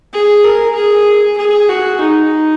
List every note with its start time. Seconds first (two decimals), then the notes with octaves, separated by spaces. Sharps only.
0.13 G#4
0.45 A#4
0.75 G#4
1.37 G#4
1.69 F#4
2.01 D#4